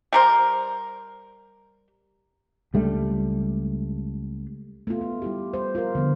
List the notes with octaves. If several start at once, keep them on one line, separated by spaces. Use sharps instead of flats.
G3 A#4 C5
C#2 G3 A3 D4
A3 B3 F4
A3
G3 E4 G4
C5
F4 A#4
D3 F3 B3